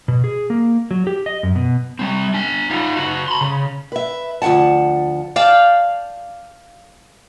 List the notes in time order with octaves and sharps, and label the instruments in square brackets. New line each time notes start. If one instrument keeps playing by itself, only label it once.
[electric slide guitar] B2
G#4
A#3
F#3
G4
D#5
F#2
B2
[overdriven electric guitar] G3 C4
D4 G#5
D#4 F4
C#3 F#4
B5 C6
C#3
[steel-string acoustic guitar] B4 E5
D2 F3 A3 F#5 A5
[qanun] D5 F5 G5 A5